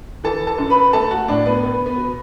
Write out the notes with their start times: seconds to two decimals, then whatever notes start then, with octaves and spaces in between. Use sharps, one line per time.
0.24 E3 A4 A5
0.47 A4 A5
0.58 F#2
0.70 B4 B5
0.93 A3 A4 A5
1.11 F#4 F#5
1.28 A2 D4 D5
1.46 B3 B4
1.63 B3 B4
1.86 B3 B4
1.97 B2